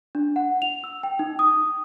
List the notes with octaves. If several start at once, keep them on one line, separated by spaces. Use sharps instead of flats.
D4
F#5
F7
E6
G5
D#4
D#6